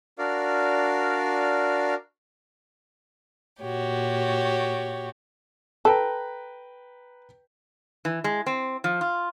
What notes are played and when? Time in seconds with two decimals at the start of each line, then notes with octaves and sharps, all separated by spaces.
0.18 D4 F#4 A#4 D5 F5
3.62 A#2 F#4 G4 C#5
5.85 A4 B4 G5 A#5
8.05 E3
8.24 G#3
8.46 C4
8.84 F3
9.01 F4